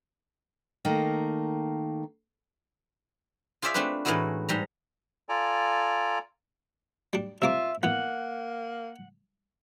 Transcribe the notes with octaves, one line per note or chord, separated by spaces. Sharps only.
D#3 A3 A#3 A#4
F4 G#4 C5 D5 E5 F5
A3 C4 D4 F4 B4
A2 E3 G#3 D#4 E4 F#4
G#2 G3 A#5
F4 A4 D5 G#5 A#5
G3 D4
C3 A#3 F4 E5 D6
E3 A#3 B3 F#5